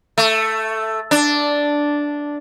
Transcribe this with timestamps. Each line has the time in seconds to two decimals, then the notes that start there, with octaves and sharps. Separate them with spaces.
0.18 A3
1.11 D4